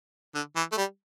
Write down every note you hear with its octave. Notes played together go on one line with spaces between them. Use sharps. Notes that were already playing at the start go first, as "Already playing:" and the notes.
D3
E3
A3
G3